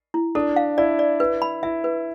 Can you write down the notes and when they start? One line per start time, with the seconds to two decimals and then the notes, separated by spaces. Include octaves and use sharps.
0.14 E4
0.35 D4 A4
0.56 F5
0.78 E4 D5
0.99 D5
1.20 B4
1.42 B5
1.63 E4 E5
1.84 B4